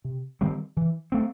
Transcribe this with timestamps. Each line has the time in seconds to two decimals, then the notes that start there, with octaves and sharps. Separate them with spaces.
0.04 C3
0.41 D#3 G3 C4
0.77 E3
1.12 A3 C4